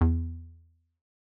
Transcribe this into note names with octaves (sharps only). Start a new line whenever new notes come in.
E2